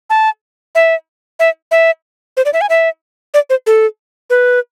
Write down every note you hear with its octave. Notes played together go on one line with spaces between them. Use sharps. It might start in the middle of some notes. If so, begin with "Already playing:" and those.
A5
E5
E5
E5
C5
D5
E5
G#5
E5
D5
C5
A4
B4